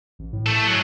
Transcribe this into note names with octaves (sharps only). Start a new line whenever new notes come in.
A1
A2
A3 A4
F#3 G#3